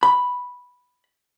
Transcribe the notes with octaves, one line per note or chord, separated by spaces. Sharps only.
B5